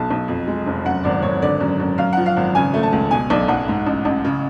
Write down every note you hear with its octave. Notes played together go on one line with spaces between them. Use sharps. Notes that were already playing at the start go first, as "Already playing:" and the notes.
Already playing: B1 B2 A5
B1
F2
G#3
F1
F#2 F#5
G#1 D5
G#1 C#5
D3 D5
F#2
F#2
F#2 F5
F3 F#5
F5
G#1
C#3 G#5
A3
A5
C#2
B2 G#5
B1 D5
B1 F#5
G#2
A1
A1
C#3